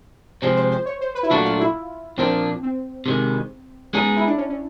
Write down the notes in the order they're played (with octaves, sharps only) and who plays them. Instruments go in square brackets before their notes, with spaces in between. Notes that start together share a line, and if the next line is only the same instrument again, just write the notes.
[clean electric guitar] C3 F3 G#3 C4 [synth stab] C5
[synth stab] C5
C5
C#5
C5
B4
E4
[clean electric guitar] A#2 F#3 A3 D4 F#4 [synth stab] F4
[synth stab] F4
E4
[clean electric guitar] A#2 F3 A#3 D4 [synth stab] C4
[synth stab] C4
[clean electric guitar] C3 D#3 G#3
[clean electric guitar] G#3 B3 D#4 G#4 [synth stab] C#4
[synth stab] E4
D4
C#4
C#4